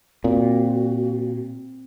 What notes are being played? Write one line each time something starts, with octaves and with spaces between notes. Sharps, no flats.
A#2 C4 F#4